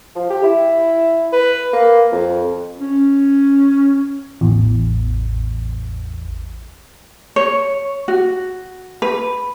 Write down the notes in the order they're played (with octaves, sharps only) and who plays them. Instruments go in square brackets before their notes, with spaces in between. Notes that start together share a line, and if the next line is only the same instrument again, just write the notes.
[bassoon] F3
G4
E4
B4
A#3
F2
[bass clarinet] C#4
[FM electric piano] A1 E2
[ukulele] C#5
F#4
B4